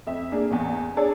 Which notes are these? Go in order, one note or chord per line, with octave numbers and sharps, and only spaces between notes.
F2 E5
A#3 D4 G#4
A1 E2
D4 G#4 A4 C#5 D5